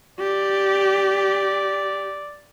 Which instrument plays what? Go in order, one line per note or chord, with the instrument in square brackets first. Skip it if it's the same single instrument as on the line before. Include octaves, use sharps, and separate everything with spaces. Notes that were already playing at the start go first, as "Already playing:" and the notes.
[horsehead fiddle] G4 [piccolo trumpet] D5